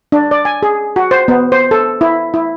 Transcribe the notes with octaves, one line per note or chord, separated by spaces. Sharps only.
D4
D5
G#5
G#4
F#4
C5
B3
C5
A4
E4
E4